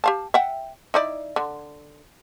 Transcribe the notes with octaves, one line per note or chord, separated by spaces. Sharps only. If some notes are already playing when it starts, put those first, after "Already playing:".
G4 F5 A5
E5 F#5 G5
D#4 E4 D5
D3